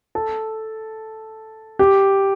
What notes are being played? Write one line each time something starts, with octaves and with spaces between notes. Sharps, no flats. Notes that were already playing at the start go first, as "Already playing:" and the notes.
A4
G4